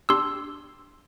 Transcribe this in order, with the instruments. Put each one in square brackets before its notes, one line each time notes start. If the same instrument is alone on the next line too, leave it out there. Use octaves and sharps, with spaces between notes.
[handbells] D4 G4 C6 E6